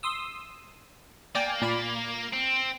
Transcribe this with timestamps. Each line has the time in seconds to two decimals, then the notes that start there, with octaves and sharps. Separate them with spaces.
0.03 C6 D#6 E6
1.35 A#3 D5 G5 G#5
1.62 A#2 D5 B5
2.33 C4